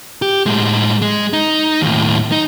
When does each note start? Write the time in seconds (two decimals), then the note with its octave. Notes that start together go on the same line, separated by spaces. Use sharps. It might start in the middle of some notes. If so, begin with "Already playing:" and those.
0.22 G4
0.46 A2 G#3
1.02 G#3
1.33 D#4
1.81 D#2 A2
2.32 D#4